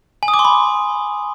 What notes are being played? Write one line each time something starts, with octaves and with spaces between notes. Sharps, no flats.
G#5
D#6
D6
C6
B5